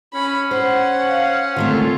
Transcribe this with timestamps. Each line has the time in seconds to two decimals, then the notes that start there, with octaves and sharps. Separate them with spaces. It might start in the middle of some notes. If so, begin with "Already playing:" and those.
0.14 C#4 B5
0.51 C5 F#5
1.08 F5
1.56 D3 D#3 A3 C4 F4